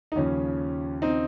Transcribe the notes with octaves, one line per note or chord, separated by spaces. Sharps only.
D#4
D#2 C#3 F3 C#4
C4 D#4